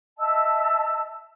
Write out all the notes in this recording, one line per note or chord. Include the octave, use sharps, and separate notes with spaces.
D#5 E5 A5 E6